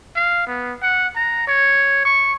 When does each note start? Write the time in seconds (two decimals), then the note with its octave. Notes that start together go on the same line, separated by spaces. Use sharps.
0.16 F5
0.47 B3
0.82 F#5
1.16 A#5
1.48 C#5
2.05 C#6